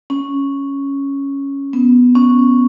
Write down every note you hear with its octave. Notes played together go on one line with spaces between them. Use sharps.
C#4
B3
C#4